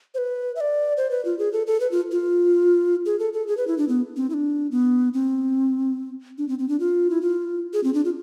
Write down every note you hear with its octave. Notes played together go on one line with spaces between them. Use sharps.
C5
B4
E5
D5
C5
B4
F4
G#4
A4
A4
B4
F4
F4
G#4
A4
A4
G#4
B4
E4
D4
B3
C4
E4
D4
B3
C4
D4
C4
C4
D4
F4
E4
F4
G#4
C4
D4
F4